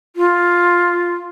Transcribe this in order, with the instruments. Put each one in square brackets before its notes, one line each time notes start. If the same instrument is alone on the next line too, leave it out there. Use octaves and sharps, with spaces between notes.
[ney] F4